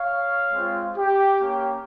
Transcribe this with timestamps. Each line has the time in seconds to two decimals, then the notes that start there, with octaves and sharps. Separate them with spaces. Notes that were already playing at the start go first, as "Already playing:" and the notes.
Already playing: C#5 F5
0.52 G#3 C4 F4
0.97 G4
1.40 A#3 C#4 G4